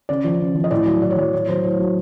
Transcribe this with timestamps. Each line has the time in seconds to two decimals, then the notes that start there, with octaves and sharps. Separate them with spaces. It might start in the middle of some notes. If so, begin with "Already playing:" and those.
0.09 C#3 D5
0.24 F3
0.40 C#3
0.55 F3
0.64 D#5
0.71 A2 D5
0.86 F#3
1.02 A2 D5
1.11 C#5
1.17 F#3 D5
1.33 A2 C#5
1.49 F#3 C5
1.64 A2 C#5
1.80 F#3